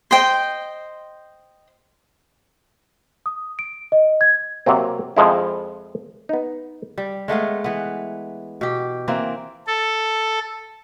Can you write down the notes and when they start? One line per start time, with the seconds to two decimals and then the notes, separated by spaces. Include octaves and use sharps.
0.11 C5 D#5 G5
3.26 D#6
3.59 D7
3.92 D#5
4.21 G#6
4.66 C3 F#3 A#3 C4
5.17 F2 F3 G#3 E4
6.29 B3 D#4
6.98 G3
7.28 G#3 A3 B3 F5
7.64 E3 B3
8.61 B2 G4
9.08 E3 A#3 C4
9.67 A4